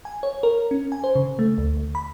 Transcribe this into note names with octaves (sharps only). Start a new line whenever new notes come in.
G#5
C#5
A#4
C#4
G#5
C5
C#3
A3
D2
D2
B5